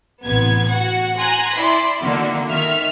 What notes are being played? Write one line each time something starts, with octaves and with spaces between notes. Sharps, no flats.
A1 C3 B3 G#6
F#4 F#5
G#5 A#5 C6 F#6 A#6
E4 D5 B5 C6
D3 D#3 A#3 F#4
D#3 E5 F6